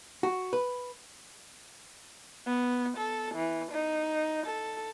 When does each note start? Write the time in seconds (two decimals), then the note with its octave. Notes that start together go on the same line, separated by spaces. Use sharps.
0.23 F#4
0.53 B4
2.47 B3
2.97 A4
3.34 E3
3.71 D#4
4.46 A4